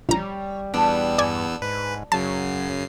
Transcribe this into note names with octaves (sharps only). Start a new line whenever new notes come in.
A#1 G3 C#5 A#5
E2 G3 B3 D4 E6
G2 D5 G#5
G#2 B4
F#2 C#3 F#3 A5 C7